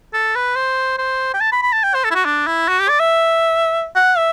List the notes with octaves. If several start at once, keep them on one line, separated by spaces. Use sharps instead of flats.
A4
B4
C5
C5
G5
A5
B5
B5
A5
G5
C5
A4
E4
F#4
D4
E4
F#4
G4
D5
E5
F#5
E5